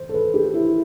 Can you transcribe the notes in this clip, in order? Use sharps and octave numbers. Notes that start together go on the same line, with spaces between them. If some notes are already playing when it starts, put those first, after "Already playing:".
Already playing: C5
A4
B4
G4
E4